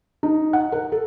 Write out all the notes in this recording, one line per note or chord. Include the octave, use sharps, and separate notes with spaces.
D#4
F#5
A#4
A4